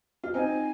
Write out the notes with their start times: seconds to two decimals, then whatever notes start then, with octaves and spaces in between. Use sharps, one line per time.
0.24 F4
0.34 C4 D#4 G#5